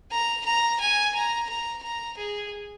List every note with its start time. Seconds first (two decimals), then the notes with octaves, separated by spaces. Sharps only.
0.11 A#5
0.45 A#5
0.80 G#5
1.15 A#5
1.49 A#5
1.83 A#5
2.18 G#4